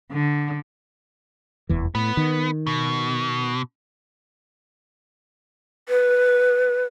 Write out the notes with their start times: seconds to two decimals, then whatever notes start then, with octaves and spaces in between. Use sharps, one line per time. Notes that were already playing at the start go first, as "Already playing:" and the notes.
0.12 D3
1.69 F1 E2 E3
1.95 A2 B3
2.17 D#3
2.67 B2
5.89 B4